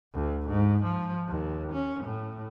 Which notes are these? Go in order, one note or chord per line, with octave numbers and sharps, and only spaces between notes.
D2
G#2
F3
D#2
C#4
A2